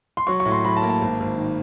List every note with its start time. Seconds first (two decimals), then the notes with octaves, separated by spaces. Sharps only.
0.17 C6
0.27 F#3 C#6
0.40 C#6
0.45 A2
0.52 C6
0.65 F#3 B5
0.77 A5
0.82 A#3
0.89 A5
1.01 G#1
1.20 G#1
1.37 D#3